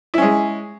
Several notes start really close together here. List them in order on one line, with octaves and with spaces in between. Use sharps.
E4 C#4 G#3